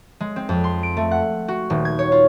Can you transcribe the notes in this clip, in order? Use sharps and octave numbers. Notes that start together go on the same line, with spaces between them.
G#3
C4
F2
C6
D7
A3
F#5
F#4
D#1
G#6
C#5
F4